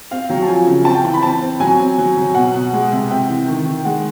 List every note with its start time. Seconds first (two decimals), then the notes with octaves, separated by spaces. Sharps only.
0.11 C4 F5
0.29 F#3 G5
0.42 A5
0.48 F3 G#5
0.66 C#3
0.85 C4 A5
0.95 G5
1.04 E3 A5
1.14 B5
1.23 C4 A5
1.42 C4
1.60 F#3 G#5
1.80 C4
1.98 F#3
2.17 F#3
2.35 B2 F#5
2.54 B2
2.73 G#3
2.92 C3
3.11 C3 G5
3.29 E3
3.48 D#3
3.66 D#3
3.85 G#3 F#5